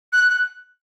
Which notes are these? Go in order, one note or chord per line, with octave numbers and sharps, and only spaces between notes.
F#6
F#6